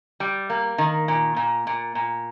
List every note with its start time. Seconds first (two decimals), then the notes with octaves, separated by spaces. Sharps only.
0.20 G3
0.50 A#3
0.78 D#3
1.08 A#2
1.36 A#2
1.67 A#2
1.95 A#2